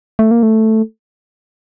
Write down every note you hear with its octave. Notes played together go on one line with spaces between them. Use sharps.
A3
A#3
A3